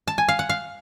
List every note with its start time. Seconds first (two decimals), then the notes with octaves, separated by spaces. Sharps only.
0.07 A5
0.18 G#5
0.28 F5
0.39 F#5
0.49 F5